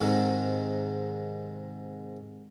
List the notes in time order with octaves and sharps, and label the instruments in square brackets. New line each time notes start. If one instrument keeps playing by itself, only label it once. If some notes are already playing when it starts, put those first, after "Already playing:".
[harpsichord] G#2 C3 D#3